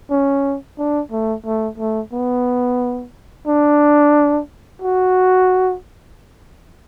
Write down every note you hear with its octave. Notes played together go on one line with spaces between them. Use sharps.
C#4
D4
A3
A3
A3
B3
D4
F#4